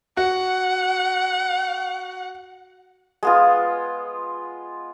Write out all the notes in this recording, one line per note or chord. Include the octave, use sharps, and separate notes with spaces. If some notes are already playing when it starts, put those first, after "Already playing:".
F#4 F#5
G#3 B3 F4